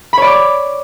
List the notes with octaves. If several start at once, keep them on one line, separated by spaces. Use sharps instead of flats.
C#5 D5 B5 D6